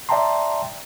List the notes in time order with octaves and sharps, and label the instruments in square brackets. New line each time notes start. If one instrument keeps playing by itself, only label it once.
[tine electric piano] D5 E5 G5 A5 A#5 C6